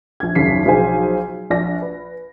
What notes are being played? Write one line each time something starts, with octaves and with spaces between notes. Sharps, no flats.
A#1 G#6
F#1 D#2 C#3 B6 C7
B1 F3 G#4 C5 G#5
A#1 D4 A#6
B4